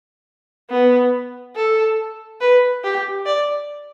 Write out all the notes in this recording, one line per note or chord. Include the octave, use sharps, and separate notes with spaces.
B3
A4
B4
G4
D5